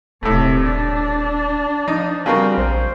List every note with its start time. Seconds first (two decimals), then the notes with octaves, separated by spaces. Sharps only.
0.23 D#1 A2 C3 A3
0.66 D4
1.88 F3 D#4
2.26 C#3 G3 C4 F#4 A#4
2.58 A#1 C5